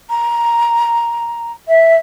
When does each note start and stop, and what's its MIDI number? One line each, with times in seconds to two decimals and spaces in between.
0.09 1.52 82
1.68 1.95 76